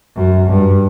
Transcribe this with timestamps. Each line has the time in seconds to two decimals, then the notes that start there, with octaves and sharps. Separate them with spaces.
0.16 F#2
0.49 G2